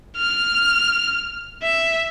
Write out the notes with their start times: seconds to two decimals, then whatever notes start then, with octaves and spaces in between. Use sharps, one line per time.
0.17 F6
1.63 E5